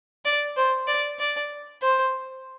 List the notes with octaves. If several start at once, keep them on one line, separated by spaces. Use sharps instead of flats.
D5
C5
D5
D5
C5